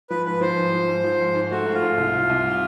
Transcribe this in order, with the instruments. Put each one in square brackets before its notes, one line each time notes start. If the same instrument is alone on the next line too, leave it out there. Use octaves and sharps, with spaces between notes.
[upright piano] F3 [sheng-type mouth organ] B4
[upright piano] G#2 [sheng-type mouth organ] B4
[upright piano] F3 [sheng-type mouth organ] C5
[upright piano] G#2
F3
G#2
F3
G#2
G#2
[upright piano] A3 [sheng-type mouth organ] F#4
[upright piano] G#2
[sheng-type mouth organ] F4
[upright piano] G#2
C2
C2
C2